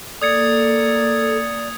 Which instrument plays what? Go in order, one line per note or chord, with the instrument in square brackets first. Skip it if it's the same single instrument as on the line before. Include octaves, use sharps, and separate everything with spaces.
[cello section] A#3 [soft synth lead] A4 [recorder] D5 [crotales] D#6 G#6 C#7